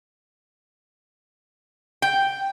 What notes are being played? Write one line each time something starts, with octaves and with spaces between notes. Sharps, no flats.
G5